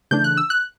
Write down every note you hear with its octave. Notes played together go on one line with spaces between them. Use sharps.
C#3 E3 A3 D4 G6
F#6
E6
F#6